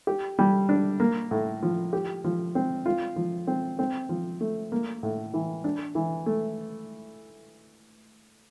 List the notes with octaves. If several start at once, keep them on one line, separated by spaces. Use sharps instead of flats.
G4
G3
D4
A#3
A2
F3
G4
F3
C4
F4
F3
C4
C4
F3
A3
A#3
A2
E3
D4
E3
A3